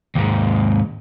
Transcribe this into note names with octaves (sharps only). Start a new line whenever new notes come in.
D#2 G#2